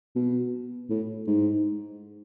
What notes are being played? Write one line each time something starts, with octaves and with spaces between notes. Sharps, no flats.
B2
A2
G#2